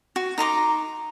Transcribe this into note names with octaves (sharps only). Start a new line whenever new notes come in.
F#4
D#4 A#5 C6 D6